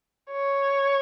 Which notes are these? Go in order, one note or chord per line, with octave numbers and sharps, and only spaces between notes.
C#5